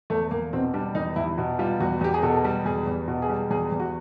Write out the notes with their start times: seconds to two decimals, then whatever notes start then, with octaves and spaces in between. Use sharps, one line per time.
0.10 E2 A3
0.31 E2 A#3
0.53 B2 C4
0.74 G3 D4
0.95 E2 D#4
1.16 E2 E4
1.38 B2
1.59 G3 F4
1.80 E2 F#4
2.01 E2 G4
2.14 G#4
2.22 B2 A4
2.45 G3
2.65 E2 G#4
2.87 E2
3.08 B2
3.22 G#4
3.29 G3
3.51 E2 G#4
3.72 E2
3.80 F#4